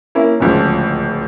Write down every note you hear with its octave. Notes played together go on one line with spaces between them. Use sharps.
A#3 C#4 E4
D1 C#2 C#3 F3